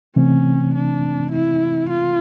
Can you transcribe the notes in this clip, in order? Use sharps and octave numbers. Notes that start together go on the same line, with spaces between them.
C3 E3 A3 C4 C#4
D4
E4
F4